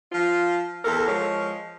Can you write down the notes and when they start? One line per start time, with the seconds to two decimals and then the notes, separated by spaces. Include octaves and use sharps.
0.12 F3 F4
0.85 E2 A4 A#4
1.08 F3 G#3 C#5